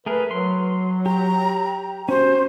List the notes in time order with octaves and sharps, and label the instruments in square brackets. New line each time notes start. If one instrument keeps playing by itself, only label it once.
[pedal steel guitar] A3 G#4 A#4 [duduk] B4
[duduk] F#3 [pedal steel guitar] C6
[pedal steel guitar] G4 [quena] A#5
[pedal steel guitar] C#4 F#4 [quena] C5